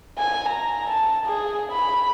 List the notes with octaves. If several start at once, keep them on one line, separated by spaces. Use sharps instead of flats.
G#5
A#5
A5
G#4
B5